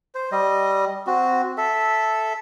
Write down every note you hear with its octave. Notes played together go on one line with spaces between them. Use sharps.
C5
G3 D#5
C4 F#4
A4 E5